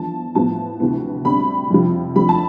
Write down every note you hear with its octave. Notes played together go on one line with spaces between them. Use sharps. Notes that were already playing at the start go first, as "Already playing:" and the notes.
Already playing: E2 D3 F3 A5
A2 F3 B3 A5
D2 C3 E3 B3
D2 D3 G3 C4 B5
F2 C3 F3
F2 D3 F3 A3 B5
A5